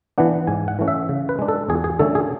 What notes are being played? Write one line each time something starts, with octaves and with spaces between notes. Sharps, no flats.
E3 B3 D4 F#5
G#2 G#5
F#5
E3 A3 C#4
E5
C#3
B4
G#3 D4
A4
E2 G#4
G#4
D3 A3 C#4 A4
G#4